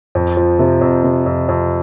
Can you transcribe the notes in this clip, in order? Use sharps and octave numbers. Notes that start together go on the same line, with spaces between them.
F2
F3
C3
F2
C3
F2
F2